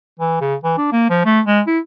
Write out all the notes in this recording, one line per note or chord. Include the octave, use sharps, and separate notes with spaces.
E3
C#3
E3
D4
A#3
F3
A3
G#3
E4